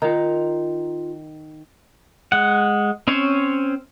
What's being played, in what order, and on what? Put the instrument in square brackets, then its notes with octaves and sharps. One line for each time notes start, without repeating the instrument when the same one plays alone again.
[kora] D#3 [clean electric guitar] F4 A#5
[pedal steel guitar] G#3 F#5
C4 C#4 C5 C#5